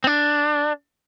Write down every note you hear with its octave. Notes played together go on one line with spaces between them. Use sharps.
C4
D4